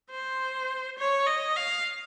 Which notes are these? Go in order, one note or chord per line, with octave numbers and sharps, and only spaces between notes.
C5
C#5
D#5
F5